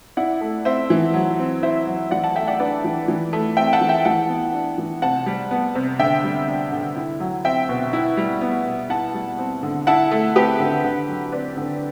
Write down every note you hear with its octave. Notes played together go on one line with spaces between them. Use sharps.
E4 D5 F#5
A3
C4 C5 E5
E3
F#3
C4
E4 C5 E5
F#3
E3 D5 F#5
F#5 A5
A3 E5 G5
D5 F#5
D4 B4 D5
E3
E3
A3
C4 E5 G5
F#5 A5
E3
E5 G5
E3 F#5 A5
B3
D4
E3
C3 F#5 A5
G3
B3
C3
D3 E5 G5
G3
D4
D3
E4
F#3
C4 E5 G5
B2
E4
G3
B3
B2
E4 F#5 A5
G3
C4
D3
E4 F#5 A5
A3
C4 G4 B4
D3
D3
F#3
C4 B4 D5
D3